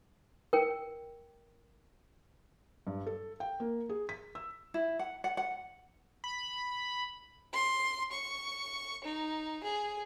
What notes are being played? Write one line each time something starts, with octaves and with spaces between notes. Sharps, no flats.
A#4 G5
G2
A4
G5
A#3
G#4
B6
E6
E4
F#5
F#5
F#5
B5
C6
C#6
D#4
G#4